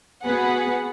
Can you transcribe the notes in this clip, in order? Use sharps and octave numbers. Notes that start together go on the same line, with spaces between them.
B3 F#4 G#4 B4 F#5